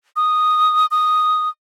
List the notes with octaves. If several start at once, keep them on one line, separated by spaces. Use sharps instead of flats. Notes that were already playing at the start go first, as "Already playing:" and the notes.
D#6
D#6